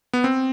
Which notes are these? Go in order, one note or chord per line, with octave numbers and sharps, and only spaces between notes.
B3
C4